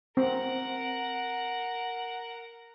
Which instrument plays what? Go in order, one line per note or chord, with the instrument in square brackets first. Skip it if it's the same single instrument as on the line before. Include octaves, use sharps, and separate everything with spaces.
[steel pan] C4 [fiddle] A#4 F#5